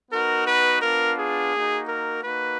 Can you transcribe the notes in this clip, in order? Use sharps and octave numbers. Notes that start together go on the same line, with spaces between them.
B3 D#4 F#4 A#4
B4
B3 D4 F4 A#4
G#4
A#3 D#4 F#4
A#4
A#3 D#4 F#4 B4